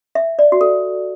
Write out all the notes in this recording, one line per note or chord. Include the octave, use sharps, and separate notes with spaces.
E5
D5
F#4
A4